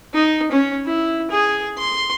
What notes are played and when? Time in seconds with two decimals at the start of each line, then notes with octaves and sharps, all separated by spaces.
0.14 D#4
0.52 C#4
0.86 E4
1.31 G#4
1.77 C6